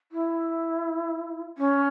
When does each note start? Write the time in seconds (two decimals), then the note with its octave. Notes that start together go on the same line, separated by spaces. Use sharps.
0.12 E4
1.58 C#4